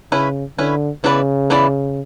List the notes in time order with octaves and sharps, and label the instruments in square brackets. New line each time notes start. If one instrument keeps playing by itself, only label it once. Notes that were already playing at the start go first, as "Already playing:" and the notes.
[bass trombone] C#3 [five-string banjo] C#4 E4 B4
[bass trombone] D3 [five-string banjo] C#4 E4 B4
[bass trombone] C#3 [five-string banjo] E3 B3 E4 B4 D5
[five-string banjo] E3 B3 E4 B4 D5